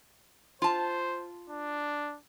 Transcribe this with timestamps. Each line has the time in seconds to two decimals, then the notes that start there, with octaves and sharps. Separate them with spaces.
0.62 F4 C5 A5
1.49 D4